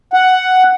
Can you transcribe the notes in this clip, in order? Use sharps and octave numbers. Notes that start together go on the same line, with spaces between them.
F#5